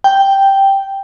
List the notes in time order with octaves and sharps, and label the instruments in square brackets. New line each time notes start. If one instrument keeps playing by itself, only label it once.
[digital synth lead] G5